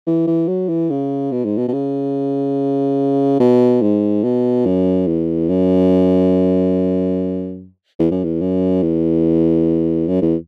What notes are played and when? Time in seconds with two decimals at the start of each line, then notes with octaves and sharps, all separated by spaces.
0.06 E3
0.27 E3
0.48 F#3
0.68 E3
0.90 C#3
1.32 B2
1.45 G#2
1.58 B2
1.68 B2
1.73 C#3
3.40 B2
3.82 G#2
4.24 B2
4.66 F#2
5.07 E2
5.49 F#2
7.99 E2
8.11 F#2
8.24 E2
8.41 F#2
8.82 E2
10.08 F#2
10.22 E2